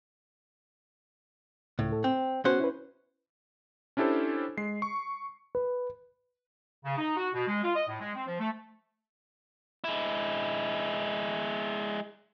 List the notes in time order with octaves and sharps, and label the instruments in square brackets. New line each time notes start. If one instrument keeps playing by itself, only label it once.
[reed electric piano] C#2 [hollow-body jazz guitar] A2
[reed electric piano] A4
[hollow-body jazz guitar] C4 [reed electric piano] G5
[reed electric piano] B3 F#4 F#6 [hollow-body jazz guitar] C#4 C5
[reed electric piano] E4 B4
[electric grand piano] C#4 D4 E4 G4 A4 C5
G#3 C7
C#6
B4
[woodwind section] C#3
D#4
F#4
B2
G#3
F4
D#5
A2
G#3
C4
F3
A3
[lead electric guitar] G#3 E4